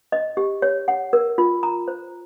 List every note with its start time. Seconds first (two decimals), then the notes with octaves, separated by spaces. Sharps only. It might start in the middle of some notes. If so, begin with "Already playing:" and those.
0.12 D#5
0.37 G4
0.62 C#5
0.88 F#5
1.13 A#4
1.38 F4
1.63 A#5
1.88 C5